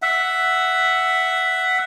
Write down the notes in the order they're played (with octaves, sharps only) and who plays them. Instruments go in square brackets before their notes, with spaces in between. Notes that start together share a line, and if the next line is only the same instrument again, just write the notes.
[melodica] E5 F#5